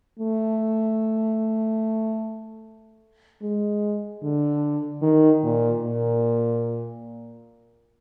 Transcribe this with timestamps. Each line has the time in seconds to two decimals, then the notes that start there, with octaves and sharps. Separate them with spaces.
0.19 A3
3.42 G#3
4.22 D3
5.02 D#3
5.43 A#2
5.83 A#2